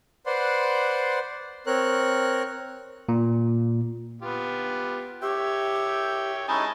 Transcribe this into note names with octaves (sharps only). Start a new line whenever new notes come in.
B4 C5 D5 F#5 C6
C4 A#4 C#5 F#6
A#2
B3 F4 G4
G4 C#5 E5 G5
C#4 D#4 E4 D#5 G#5 A5